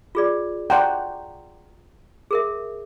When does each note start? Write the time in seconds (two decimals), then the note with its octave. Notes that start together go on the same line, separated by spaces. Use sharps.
0.15 F4 G#4 D5
0.70 D5 F#5 G5 A#5 C6
2.31 G#4 A#4 E5